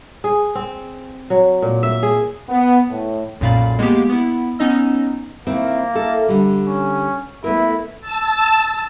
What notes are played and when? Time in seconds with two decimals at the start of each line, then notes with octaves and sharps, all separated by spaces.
0.24 G#4
0.55 C4
1.30 F#3
1.62 A#2
1.83 E5
2.03 G#4
2.49 B3
2.90 A2
3.41 B1 F#2 A#2 F5 B5 A6
3.79 G#3 A#3 B3 G4
4.09 B3 E4
4.59 B3 C#4 D#4 D#5 E6
5.47 D#3 A#3 C4 E4
5.95 E4 A4
6.29 D3 G3
6.67 C#4
7.44 A3 B3 E4 A#4
8.01 A5 E6